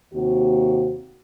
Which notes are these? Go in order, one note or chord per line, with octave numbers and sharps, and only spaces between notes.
D#2 C3 A#3 F#4